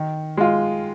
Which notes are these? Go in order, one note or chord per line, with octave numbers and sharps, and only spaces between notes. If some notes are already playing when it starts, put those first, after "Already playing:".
Already playing: D#3
G#3 F4